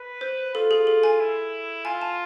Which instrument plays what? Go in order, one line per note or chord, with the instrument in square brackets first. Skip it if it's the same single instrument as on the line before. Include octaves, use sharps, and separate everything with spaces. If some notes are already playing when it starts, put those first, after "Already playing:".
Already playing: [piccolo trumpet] B4
[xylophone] C5
[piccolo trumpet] F4 [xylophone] A4
[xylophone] G#4
A4
G#5
[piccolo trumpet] E4
[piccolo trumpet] F4 [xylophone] G#5
[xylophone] A5